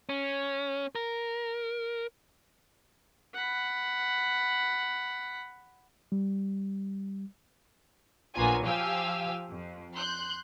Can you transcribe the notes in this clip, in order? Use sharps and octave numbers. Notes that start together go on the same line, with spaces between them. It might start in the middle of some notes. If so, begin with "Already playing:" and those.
C#4
A#4
F#5 B5
G3
A#1 F#3 A#3 B3 F4 G#5
F3 G4 F5 G5 G#5 E6
F2
C6 F#6 G6